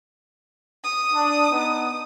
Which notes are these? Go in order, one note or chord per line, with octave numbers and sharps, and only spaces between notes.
D#6
D4
B3 D#4